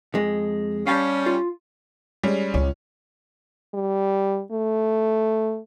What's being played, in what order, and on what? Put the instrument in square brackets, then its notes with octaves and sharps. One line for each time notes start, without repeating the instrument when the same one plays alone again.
[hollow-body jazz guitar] F2 G#3
[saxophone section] G3 C#4 [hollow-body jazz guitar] F5 G5 A5
[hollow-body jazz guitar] F4
[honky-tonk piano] G3 G#3 C#4
[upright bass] C#2 [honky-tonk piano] C#4
[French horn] G3
A3